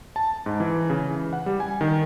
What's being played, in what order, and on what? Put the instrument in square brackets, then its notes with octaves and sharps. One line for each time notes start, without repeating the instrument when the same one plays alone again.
[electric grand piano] A5
G#2
E3
C#3
E3
F#5
G3
G#5
D#3